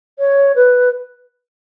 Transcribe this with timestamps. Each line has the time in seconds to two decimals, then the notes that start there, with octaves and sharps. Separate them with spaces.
0.19 C#5
0.56 B4